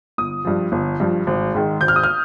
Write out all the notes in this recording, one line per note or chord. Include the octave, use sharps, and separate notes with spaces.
G1 D#6
G2 F3
G1
G2 F3
G#1
G#2 D#3
G#1 G6
F6
D#6
F6